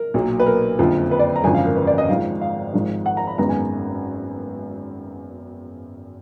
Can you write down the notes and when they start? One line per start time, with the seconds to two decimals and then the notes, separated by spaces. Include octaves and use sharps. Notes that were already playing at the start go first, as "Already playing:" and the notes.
Already playing: A#4
0.14 B1 A#2 F#3 A#3
0.40 B4
0.46 A#4
0.79 F#1 F2 D3 F3
1.11 B4
1.19 D5
1.36 A#5
1.44 G#1 F#2 D3 F3 G#5
1.54 F5
1.65 A#4
1.76 B4
1.87 D5
1.98 D#5
2.09 G#1 G#2 F3 F5
2.41 F5
2.74 G#1 G#2 F3
3.06 F#5
3.17 A#5
3.27 B5
3.38 G#1 F#2 D#3 G#3 B3 A#5
3.49 G#5